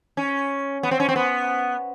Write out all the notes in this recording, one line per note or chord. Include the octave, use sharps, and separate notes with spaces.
C#4
B3
C4
C#4
C4
B3